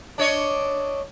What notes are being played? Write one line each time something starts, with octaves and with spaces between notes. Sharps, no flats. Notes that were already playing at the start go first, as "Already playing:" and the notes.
D4 C#5 D#5